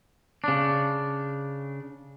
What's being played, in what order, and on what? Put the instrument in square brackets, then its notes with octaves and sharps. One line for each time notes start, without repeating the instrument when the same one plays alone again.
[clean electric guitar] C#3 D4